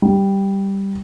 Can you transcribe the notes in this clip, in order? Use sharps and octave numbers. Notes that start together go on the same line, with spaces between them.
G3